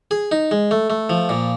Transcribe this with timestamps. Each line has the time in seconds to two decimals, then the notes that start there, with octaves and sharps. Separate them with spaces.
0.11 G#4
0.32 D#4
0.51 G#3
0.71 A3
0.90 A3
1.10 F3
1.29 A#2